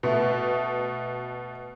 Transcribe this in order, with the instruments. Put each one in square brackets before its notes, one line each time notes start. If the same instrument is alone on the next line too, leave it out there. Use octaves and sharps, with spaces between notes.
[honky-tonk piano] B2 A3